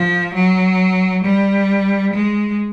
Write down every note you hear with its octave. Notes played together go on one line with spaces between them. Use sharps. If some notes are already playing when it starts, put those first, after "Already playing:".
Already playing: F3
F#3
G3
G#3